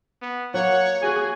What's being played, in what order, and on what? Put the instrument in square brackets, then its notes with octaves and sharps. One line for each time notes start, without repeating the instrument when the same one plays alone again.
[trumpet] B3
[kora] F#3 A#3 [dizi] C#5 [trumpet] F#5
[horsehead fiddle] F#4 G#4 [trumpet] G#5